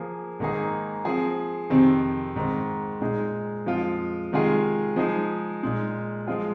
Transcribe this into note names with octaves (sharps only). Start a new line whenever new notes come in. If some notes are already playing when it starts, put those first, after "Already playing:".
Already playing: F3 A#3 G#4
G#2 D#3 A#3 D#4 G#4
F3 C4 G#4
F2 C3 D#3 C4
G#2 D#3 C4
A#2 G#3 D#4 G#4
F2 F3 G#3 F4
C3 D#3 G#3 F4 G#4
F3 G#3 D#4 G#4
A#2 G#3 D#4
F3 G#3 F4 G#4